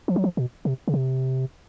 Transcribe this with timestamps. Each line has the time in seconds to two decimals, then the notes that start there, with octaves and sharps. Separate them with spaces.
0.08 F3
0.16 F#3
0.24 F3
0.37 B2
0.65 C3
0.88 C#3
0.94 C3